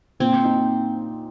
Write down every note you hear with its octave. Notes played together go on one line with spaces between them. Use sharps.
A#2 C4
D#4